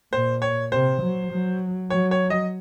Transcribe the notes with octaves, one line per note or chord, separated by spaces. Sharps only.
A#2 C5
C#5
C3 C5
F#3
F#3
F#3 C#5
C#5
D#5